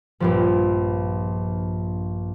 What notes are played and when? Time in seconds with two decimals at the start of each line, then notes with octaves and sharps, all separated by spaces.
0.20 A#1 G2 F3